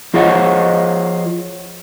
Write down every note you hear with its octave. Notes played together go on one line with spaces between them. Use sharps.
F3 F4 G#4 C#5 D#5 F#5